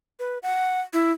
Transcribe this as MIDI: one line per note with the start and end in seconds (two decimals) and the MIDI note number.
0.19 0.38 71
0.43 0.81 78
0.93 1.12 64